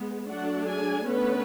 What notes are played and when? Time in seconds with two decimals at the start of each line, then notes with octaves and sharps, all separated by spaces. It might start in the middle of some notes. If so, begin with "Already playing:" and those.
Already playing: G#3 B3
0.27 F#3 A3 D4 F#4 F#5
0.66 G#4 G#5
1.05 D3 A3 B3 C#4 B4